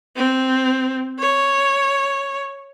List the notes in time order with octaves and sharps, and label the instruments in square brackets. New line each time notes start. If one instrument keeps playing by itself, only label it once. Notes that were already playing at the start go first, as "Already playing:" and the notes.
[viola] C4
C#5